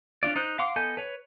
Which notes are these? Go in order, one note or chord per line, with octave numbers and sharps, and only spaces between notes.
C#4 D4 F4 D5
D#4 C5 F#6
F5 F#5 C6 D6
B3 A4 D#5 G#5 G6
B4 C#5